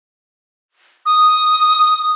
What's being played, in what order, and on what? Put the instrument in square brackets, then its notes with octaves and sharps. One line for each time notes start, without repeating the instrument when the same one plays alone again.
[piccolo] D#6